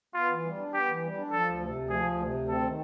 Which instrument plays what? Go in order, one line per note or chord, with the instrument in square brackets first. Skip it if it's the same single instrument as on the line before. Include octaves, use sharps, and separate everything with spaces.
[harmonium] B3 [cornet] F4
[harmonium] E3
G3
D4
[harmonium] B3 [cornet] G4
[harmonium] E3
G3
D4
[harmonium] F3 [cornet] A4
[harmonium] D2
C3
D2
[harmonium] F3 [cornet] G#4
[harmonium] D2
C3
D2
[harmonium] C4 [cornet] A4
[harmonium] D#3